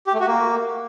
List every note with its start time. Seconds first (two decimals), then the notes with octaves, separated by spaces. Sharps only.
0.07 G4
0.14 A3
0.20 F#4
0.27 A#3